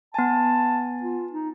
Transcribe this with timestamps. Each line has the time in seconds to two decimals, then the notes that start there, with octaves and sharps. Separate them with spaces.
0.14 B3 G#5 A5
1.03 F4
1.33 D#4